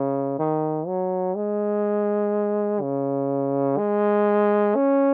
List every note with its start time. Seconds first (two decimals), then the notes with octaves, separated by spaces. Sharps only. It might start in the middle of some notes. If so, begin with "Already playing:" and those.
Already playing: C#3
0.39 D#3
0.87 F#3
1.35 G#3
2.82 C#3
3.78 G#3
4.75 C#4